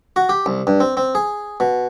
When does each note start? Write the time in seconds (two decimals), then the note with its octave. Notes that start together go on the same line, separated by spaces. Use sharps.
0.16 F#4
0.29 G4
0.46 C2
0.67 G2
0.80 C4
0.97 C4
1.15 G#4
1.60 B2